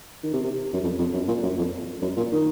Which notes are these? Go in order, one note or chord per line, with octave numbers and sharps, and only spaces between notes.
D#3
C3
C3
F#2
F2
F2
F#2
A#2
F#2
F2
F#2
A#2
D#3